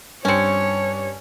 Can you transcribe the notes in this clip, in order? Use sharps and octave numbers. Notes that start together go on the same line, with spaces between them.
G2 C4 C#4 C#5 C#7